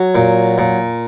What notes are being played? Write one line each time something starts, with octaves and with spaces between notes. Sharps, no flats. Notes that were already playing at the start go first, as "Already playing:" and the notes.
Already playing: F#3
A#2
A#2